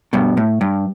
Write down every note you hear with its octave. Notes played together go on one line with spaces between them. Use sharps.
G2 B2
A2
G2